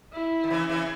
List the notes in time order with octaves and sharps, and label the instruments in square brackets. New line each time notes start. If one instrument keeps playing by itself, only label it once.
[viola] E4
[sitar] D#3
C#3 E3
C#3 E3